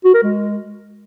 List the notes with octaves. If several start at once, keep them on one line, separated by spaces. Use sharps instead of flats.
F#4
A#4
G#3